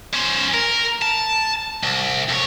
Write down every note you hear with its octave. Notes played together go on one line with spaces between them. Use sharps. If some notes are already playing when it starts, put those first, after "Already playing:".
C#4 C5
A#4
A5
C2
F2 C#5